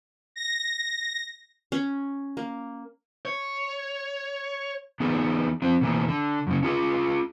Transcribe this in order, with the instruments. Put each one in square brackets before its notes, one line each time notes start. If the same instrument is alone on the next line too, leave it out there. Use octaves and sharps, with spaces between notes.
[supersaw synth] A#6
[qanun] C#4
A#3
[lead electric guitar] C#5
[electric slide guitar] E3 B3 D#4 G#4
F3 C4
B2 E3 A#3
D3
F#2 C#3
C#4 F4 G#4